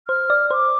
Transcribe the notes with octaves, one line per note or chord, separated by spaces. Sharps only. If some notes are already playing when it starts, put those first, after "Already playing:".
C5 F6
D5
C5 D6